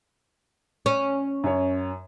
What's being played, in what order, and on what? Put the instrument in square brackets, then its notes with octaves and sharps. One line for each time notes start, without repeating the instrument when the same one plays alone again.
[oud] C#4
[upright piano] F#2 C#5